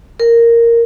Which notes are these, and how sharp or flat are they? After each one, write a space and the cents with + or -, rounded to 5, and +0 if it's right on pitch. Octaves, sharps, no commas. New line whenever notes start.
A#4 -5